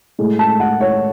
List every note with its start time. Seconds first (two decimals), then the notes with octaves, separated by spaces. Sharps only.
0.19 A2 G#3
0.39 A5
0.60 F#5
0.81 C#5